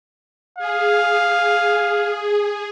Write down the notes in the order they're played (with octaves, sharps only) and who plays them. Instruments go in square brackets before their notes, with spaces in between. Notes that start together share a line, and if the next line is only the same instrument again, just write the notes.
[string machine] G#4 [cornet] F5